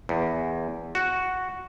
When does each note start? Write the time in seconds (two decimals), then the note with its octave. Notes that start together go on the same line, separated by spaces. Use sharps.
0.09 E2
0.95 F#4